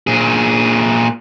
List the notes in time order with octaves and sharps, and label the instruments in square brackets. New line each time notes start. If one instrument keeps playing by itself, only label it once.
[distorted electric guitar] A#2 G#4